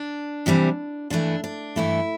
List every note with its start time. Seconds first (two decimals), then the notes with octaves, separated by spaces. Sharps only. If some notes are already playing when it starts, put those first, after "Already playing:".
Already playing: D4
0.46 C3 E3 G3 C4
1.10 G2 E3 A3 D4
1.44 D4
1.76 G2 E3 A3 E4